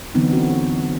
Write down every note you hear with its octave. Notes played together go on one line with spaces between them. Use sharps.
D3 E3 F#3 B3 C4 D#4
C4 C#4 F#4